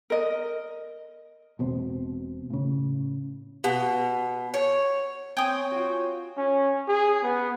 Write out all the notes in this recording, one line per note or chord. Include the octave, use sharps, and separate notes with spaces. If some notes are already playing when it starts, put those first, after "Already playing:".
A#4 D#5
E1 B2 C4
A2 C#3
B2
C#5
C4 C#5 G5 G#5 D#6
F4 F#4
C#4
G#4
B3